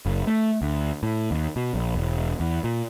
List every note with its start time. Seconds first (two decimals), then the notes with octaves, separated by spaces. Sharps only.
0.06 F#1
0.27 A3
0.62 D2
1.03 A2
1.31 D#2
1.56 B2
1.74 A#1
1.95 E1
2.40 E2
2.64 A#2